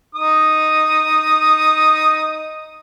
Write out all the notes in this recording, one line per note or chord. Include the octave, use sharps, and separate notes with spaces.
D#4 D#6